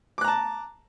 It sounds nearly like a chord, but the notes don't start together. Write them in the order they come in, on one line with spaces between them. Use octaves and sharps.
D6 F#6 A#5 A5